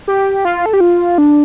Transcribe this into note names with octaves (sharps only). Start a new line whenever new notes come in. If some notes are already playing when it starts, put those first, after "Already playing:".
G4
F4
A4
G4
F4
D4